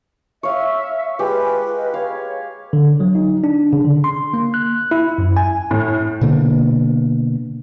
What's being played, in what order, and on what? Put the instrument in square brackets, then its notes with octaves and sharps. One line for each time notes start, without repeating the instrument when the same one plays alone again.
[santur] C#5 F5 [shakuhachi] E5
[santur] G#3 G4 [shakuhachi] F4 [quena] B4
[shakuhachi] D#5
[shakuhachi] C#5 [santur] F5
[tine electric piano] D3
F#3
D#4
D4
C#3
D3
C6
A#3
F#6
E4
F#2
G#5
[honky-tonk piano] A2
[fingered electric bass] B2 D3 A#3